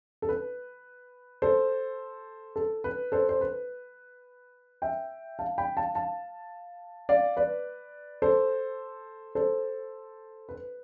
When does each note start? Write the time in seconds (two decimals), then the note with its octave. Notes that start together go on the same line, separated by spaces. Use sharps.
0.22 A4
0.29 B4
1.42 A4 C5
2.56 A4
2.84 B4
3.12 A4 C5
3.29 C5
3.41 B4
4.82 E5 G5
5.39 F5 A5
5.58 G5 B5
5.77 F5 A5
5.95 F5 A5
7.09 D5 F5
7.37 B4 D5
8.22 A4 C5
9.35 A4 C5
10.49 B4